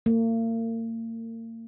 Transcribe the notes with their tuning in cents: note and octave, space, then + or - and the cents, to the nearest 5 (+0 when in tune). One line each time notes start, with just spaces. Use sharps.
A#3 -40